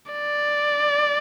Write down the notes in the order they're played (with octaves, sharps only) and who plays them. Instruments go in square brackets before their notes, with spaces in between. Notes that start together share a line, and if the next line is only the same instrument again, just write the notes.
[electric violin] D5